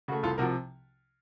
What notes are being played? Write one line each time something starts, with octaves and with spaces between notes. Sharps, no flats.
C#3 A3 F#4
C2 F4 A4
C3 F3 F#4 A#4